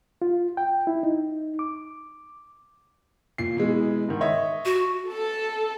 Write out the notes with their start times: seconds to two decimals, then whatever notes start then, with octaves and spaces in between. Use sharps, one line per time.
0.22 F4
0.57 G5
0.87 E4
1.03 D#4
1.59 D6
3.38 A#2 C7
3.57 B2 E3 G#3
4.09 G#2 D#3
4.21 C#5 D#5 E5
4.65 F#4
5.11 A4